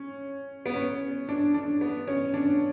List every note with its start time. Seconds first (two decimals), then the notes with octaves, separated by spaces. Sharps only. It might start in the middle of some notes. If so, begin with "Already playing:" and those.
Already playing: C#4
0.66 B3
0.75 C#4
1.29 D4
1.54 D4
1.81 B3
2.07 C#4
2.34 D4